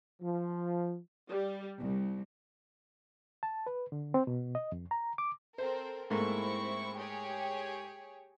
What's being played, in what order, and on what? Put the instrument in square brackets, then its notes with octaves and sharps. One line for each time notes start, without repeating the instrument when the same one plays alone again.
[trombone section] F3
[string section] G3
C2
[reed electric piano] A5
B4
D3
C4
B2
D#5
F2
A#5
D6
[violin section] C4 A4 A#4 [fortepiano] C5
[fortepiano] G#2 A3 A#3 [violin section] C4 E4 C#6
[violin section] G4 G#4 C#5